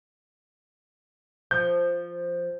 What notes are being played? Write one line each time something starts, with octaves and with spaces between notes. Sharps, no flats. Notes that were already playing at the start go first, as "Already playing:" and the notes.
F3 G6